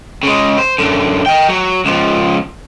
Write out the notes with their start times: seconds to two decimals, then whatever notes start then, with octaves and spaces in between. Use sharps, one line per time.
0.23 C#3 G#3
0.58 C5
0.78 F#2 D3
1.26 D#5 G5
1.49 F#3
1.85 C#2 F3